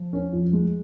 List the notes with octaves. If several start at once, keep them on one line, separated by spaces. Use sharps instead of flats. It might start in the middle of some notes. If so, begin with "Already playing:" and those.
Already playing: F3
C#4
F2
G#3